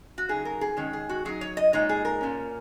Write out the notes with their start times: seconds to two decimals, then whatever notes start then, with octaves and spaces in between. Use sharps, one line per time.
0.18 F#4
0.29 C#3 F#3 D#4 G#4
0.45 A#4
0.61 G#4
0.77 D#3 G#3 C#4 C#5
0.93 G#4
1.09 F#4
1.25 F#3 D#4 G#4
1.41 C#5
1.57 D#5
1.73 A#2 G#3 D#4 C#5
1.89 G#4
2.05 A#4
2.21 A#2 A#3 C#4